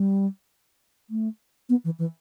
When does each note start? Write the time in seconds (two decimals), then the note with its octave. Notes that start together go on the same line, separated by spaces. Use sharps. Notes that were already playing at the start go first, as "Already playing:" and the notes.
Already playing: G3
1.10 A3
1.69 B3
1.85 E3
1.99 E3